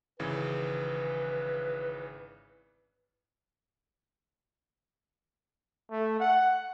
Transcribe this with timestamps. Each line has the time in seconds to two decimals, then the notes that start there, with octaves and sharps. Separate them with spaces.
0.19 G#1 C#3 E3 B4
5.91 A3
6.20 F#5